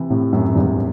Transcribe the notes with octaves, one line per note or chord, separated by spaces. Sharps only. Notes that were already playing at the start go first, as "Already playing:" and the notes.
Already playing: C3 E3
A2 C3
F#2 A2
A2
E2 G2